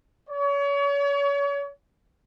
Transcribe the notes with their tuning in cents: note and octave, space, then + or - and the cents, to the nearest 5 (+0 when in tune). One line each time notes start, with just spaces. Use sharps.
C#5 +35